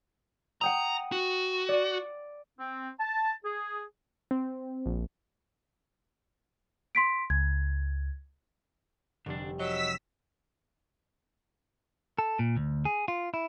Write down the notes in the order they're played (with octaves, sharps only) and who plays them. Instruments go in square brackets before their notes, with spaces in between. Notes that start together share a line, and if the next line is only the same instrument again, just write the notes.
[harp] F#5 G5 D#6 [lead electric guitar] A#5
[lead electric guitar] F#4
[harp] D5
[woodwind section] C4
A5
G#4
[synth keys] C4
A#1
[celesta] C6 B6 D7
[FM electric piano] C#2 [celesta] G#6
[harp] F1 G3 [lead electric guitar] D3 D4
[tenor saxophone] F#3 [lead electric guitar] D#5 [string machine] E6 B6
[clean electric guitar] A4
A#2
D2
G#4
F4
E4